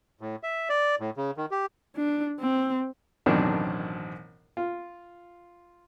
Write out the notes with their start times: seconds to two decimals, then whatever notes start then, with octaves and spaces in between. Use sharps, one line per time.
0.21 A2
0.43 E5
0.69 D5
1.00 A2
1.17 C#3
1.37 D#3
1.51 G4
1.96 D4
2.40 C4
3.26 A1 F#2 B2 D#3 C4 D4
4.57 F4